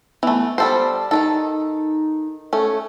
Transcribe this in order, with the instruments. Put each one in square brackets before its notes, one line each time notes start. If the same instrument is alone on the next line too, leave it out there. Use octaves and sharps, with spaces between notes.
[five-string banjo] E3 A3 [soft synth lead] B3
[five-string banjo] G3 A4 C5 [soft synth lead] A5
[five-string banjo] D#3 A3 A4 [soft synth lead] D#4
[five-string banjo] A3 C#4 [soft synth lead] A4